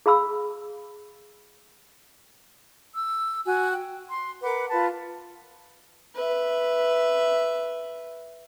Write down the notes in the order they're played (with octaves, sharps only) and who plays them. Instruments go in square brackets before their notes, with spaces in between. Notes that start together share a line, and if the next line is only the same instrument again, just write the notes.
[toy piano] G#4 F5 B5 E6
[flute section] E6
F#4 G#5
G5
C6
A#4 B4 F#5 D6
F4 B4 A5
[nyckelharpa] B4 E5